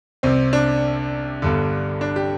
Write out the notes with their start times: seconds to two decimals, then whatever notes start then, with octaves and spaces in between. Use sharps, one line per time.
0.23 C2 C3 C4
0.53 D4
1.42 G1 G2 D3
2.01 D4
2.16 G4